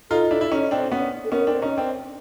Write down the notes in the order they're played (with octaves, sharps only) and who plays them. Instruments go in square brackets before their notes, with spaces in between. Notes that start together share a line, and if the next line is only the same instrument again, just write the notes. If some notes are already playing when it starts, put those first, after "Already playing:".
[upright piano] D#4 F4 [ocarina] A4
[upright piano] D4 E4
E4
C#4 D#4
C4 D4
B3 C#4
[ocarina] A4
[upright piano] B3 C#4 [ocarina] A#4
[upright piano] C4 D4
C#4 D#4
C4 D4